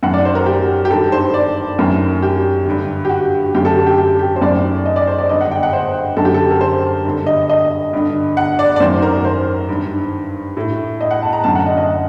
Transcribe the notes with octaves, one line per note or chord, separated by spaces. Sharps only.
F#2 D#3 F#5
D5
C5
A#4
G4
G4
G2 D#3 A4
C5
D5
F#2 D#3 A#4
G4
G2 D3
G4
F#4
F#2 D3 G4
A4
G4
G4
G4
G4
C5
F#2 D#3 D5
D#5
D5
C5
D5
G2 D3 D#5
F#5
G5
F#5
C5
F#2 D3 A4
G4
A4
A#4
C5
G2 D3
D#5
D#5
G2 D3
F#5
D5
D5
F#2 D#3 C5
A#4
C5
G2 D#3
A2
D#5
F#5
A5
A#5
F#2 D3 A5
F#5
D#5
D#5